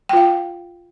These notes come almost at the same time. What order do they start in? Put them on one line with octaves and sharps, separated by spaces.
G5 F4 F5